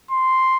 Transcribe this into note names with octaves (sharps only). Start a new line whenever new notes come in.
C6